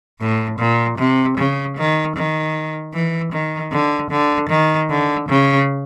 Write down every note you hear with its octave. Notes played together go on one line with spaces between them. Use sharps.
A2
A#2
C3
C#3
D#3
D#3
E3
D#3
D3
D3
D#3
D3
C#3